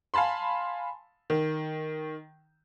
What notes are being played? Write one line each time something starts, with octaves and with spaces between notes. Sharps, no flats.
F5 G#5 A5 B5 C6
D#3